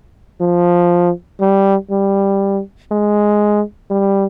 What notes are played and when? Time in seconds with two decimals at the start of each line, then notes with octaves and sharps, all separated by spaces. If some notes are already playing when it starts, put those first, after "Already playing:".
0.41 F3
1.41 G3
1.91 G3
2.91 G#3
3.90 G3